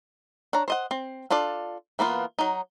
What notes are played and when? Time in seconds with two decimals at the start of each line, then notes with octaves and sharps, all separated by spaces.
0.53 D4 C#5 A#5
0.68 C5 D#5 F#5
0.91 C4
1.30 D4 F4 A4 D5
1.99 E3 A#3 B3 F4
2.39 F#3 D#4